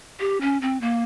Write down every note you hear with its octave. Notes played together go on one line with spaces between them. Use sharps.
G4
C#4
C4
A#3